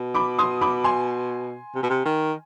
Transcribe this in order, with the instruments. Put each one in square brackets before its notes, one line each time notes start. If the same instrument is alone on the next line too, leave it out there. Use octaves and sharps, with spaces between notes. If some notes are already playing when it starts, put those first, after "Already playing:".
Already playing: [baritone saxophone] B2
[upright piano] B5 D6
C6 D#6
B5 D6
G#5 C6
[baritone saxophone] C3
B2
C3
D#3